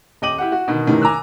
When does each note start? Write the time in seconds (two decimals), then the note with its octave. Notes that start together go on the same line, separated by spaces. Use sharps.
0.22 D#1 D#5 G5 D6 D#7 F#7
0.38 E4 G4 F#5
0.52 F#4
0.68 B2 D3 D#3
0.87 F#2 A2 C3 D#3 E3
1.02 G#5 A#5 D6 E6 F#6